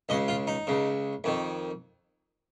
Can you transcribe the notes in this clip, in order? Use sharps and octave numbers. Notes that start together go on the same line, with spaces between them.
C#2 C#3 D#5
F4
D#4
C#2 C#3
F2 D#3